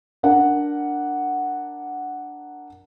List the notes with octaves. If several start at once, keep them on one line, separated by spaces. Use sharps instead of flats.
D4 A#4 F#5